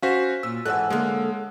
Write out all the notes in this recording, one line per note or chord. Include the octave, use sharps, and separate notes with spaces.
C#4 F#4 C5 F5 B6
A#2 E6
G#2 E3 G#3 A4 C#5 F#5 E6 F#6
D3 G#3 A#3